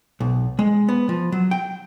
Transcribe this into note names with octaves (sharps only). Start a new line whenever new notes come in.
B1
G#3
B3
F3
F#3
G5